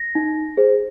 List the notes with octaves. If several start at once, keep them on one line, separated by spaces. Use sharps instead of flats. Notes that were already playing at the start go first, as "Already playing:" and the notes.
Already playing: A#6
D#4
G#4 C5